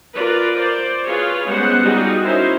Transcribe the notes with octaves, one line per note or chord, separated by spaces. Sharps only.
F4 A#4 B4 D5
C5 D5
F4 G#4 B4 C#5
G3 G#3 B3 C#4 C5 F#5
G3 D#4 F4 F#4 G#4
C#4 D#4 E4 F#4 A#4 C5